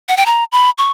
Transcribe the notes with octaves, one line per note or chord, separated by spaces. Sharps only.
F#5
G5
A#5
B5
C#6